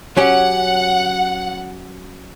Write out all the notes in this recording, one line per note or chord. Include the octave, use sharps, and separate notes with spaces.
F#3 C#4 G4 F#5